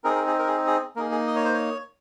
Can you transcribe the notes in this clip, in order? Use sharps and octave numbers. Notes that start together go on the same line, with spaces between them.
C4 D#4 G#4 A#4
A#4
G#4
A#4
G#4
G#4
A#3 D#4 G#4 A#4
G#4
D#5
C#5
C5
C#5